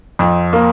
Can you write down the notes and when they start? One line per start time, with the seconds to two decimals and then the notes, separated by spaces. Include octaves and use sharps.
0.19 F2
0.53 A#3